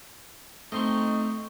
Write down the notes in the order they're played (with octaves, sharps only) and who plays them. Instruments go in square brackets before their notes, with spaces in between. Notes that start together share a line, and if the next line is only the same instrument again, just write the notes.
[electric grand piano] A3 C4 [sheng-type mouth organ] D#4 [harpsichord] D#5 C6 C#6